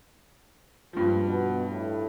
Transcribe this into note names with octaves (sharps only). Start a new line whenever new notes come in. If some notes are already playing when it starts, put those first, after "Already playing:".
G2 F3
B2
A2